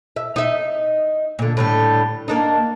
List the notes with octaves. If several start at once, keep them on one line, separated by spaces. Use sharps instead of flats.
E5
D#4 E5
A#2 D3
A2 D3 G3
A#3 D4 D#4